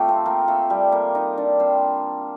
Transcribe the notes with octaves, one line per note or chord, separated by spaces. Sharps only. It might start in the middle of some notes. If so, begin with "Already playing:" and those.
Already playing: C3 F3 A3 F4 G4 A4
C4 C5
A#3 A#4
A3 A4
G3 G4
A#3 A#4
D#4 D#5
D4 D5
C4 C5